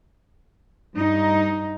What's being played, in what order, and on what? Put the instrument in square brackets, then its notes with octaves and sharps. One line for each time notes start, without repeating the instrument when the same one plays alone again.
[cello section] G2 D#4